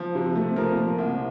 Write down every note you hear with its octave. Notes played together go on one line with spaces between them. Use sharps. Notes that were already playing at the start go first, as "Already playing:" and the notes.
Already playing: F3
C3
A3
F3 A#4
A#2
C2